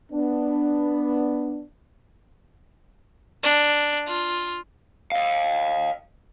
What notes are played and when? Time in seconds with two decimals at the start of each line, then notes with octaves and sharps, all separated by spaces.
0.12 B3 D4
3.43 D4
4.08 F4
5.12 D#5 F5